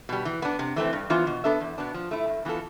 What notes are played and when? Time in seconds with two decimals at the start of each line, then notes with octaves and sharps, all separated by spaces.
0.09 B2 G3
0.25 E3
0.42 B3 D4
0.59 C3
0.76 E3 A3 C4
0.93 G2
1.10 E3 B3 F4 C5
1.27 B2
1.44 B3 D4 A4 E5
1.60 E2
1.78 B2 B3 D4
1.94 F3
2.11 A3 E4
2.28 G2
2.45 E3 B3 F4 A4